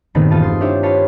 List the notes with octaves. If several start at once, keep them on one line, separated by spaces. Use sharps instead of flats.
G2 A#2 D#3 A3 B3 C4
E1 D#4 F4 A5 D#7
C6 D#6
D4 E4 G4 C5 C#5 E5
F4 B4 C#5 A5 C6